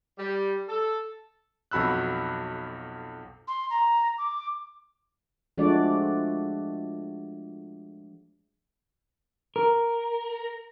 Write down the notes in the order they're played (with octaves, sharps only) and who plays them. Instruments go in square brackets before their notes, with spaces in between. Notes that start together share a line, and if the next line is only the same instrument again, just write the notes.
[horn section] G3
A4
[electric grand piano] B1 F2 F#4 B5 E6 F#6
[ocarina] C6
A#5
D6
[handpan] F3 G#3 A3 D4 F#4 D5
[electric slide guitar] A#4